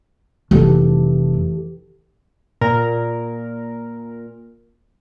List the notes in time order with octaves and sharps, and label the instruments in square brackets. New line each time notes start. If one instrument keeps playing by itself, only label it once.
[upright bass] F1 [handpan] E3 G4 A4
[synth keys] A#2 A#4